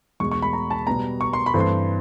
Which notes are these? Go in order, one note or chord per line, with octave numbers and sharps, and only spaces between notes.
E2 B2 G#3 C#6
C#6
B5
A#5
A5
B2 G3 B3 A#5
C#6
C6
B5
G2 E3 A3 C4
C6